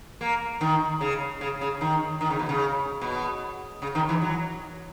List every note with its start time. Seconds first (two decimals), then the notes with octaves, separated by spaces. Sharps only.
0.21 A#3
0.61 D#3
1.01 C#3
1.41 C#3
1.61 C#3
1.81 D#3
2.21 D#3
2.30 C#3
2.39 B2
2.49 C#3
3.01 B2
3.82 C#3
3.95 D#3
4.09 E3
4.22 F#3